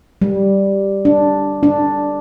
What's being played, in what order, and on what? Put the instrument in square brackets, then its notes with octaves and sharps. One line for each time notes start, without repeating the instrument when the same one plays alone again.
[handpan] G3
D4
D4